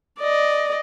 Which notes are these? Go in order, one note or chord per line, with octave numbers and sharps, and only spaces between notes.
D5 D#5